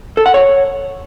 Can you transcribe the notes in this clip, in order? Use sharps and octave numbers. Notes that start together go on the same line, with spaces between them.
A4
F#5
C#5